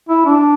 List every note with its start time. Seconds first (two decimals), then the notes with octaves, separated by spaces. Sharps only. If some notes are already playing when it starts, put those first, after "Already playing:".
0.09 E4
0.26 D4